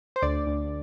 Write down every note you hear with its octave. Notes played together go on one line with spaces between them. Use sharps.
C5
D2 D5
D2